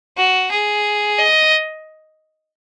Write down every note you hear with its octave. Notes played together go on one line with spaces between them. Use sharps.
F#4
G#4
D#5